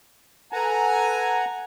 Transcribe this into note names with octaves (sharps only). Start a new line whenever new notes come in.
A4 B4 F#5 G#5 A#5